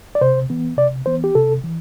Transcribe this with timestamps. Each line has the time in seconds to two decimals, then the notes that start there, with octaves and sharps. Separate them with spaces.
0.15 D5
0.21 C3 C5
0.50 E3 B3
0.77 C3 D5
1.06 E3 B3 C5
1.24 G4
1.35 C3 A4
1.64 E3